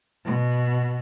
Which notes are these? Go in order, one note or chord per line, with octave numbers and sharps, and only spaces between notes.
B2